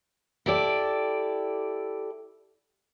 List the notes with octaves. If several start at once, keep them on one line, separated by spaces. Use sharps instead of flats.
E4 G4 A4 D5